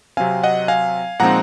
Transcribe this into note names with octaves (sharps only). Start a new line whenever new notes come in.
C3 F#3 C4 F5 G#5
D#5 F#5
F5 G#5
A#2 F3 G#3 C4 D#4 F#5 A#5